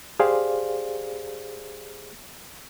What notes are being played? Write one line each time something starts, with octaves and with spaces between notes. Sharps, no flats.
G4 G#4 C5 D5 F5